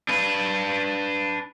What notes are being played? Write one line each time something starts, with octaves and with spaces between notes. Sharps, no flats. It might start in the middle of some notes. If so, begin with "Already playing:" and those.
D4 B4